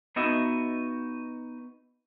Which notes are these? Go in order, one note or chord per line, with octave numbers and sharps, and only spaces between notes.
B3 D#4 F#4 D#5 E5